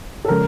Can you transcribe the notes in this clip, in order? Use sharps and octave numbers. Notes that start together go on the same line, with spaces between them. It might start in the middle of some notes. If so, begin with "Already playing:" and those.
A4
C#3 F3 G#3 C#4 A#4